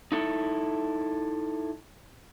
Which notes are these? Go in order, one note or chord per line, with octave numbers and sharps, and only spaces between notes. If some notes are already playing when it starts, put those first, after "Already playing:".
D#4 E4 A4